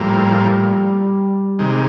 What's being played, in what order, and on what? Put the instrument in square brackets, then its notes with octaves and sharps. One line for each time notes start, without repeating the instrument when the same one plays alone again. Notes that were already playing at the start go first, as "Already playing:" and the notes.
Already playing: [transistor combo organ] A2 F3 A#3 [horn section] G3
[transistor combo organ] C3 D#3 G#3